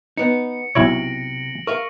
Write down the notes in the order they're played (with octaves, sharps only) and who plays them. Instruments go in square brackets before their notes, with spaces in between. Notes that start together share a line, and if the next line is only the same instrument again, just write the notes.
[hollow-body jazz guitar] B3 D#4 [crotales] C#7
[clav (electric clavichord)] B1 E4 C#5 [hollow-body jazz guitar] C3 [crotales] A#6 D7 F#7
[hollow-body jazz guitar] A#4 E5 F5 [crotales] C#6